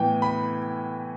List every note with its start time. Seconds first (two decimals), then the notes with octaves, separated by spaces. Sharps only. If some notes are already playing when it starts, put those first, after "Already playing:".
Already playing: A2 E3 B3 G5
0.22 B5